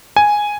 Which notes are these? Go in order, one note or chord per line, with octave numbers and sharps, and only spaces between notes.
G#5